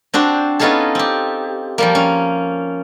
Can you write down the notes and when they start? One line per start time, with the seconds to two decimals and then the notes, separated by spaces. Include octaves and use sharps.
0.14 C4 D4 F#4 C5
0.59 B3 C#4 D#4 F4 G#4 A4
0.95 C4 G4
1.78 F3 G3 A#3
1.95 C#4